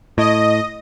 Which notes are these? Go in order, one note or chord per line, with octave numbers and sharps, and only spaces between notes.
A2 D#5